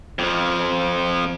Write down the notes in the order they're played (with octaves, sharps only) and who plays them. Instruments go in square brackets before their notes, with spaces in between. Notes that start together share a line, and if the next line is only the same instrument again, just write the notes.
[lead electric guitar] F2 F3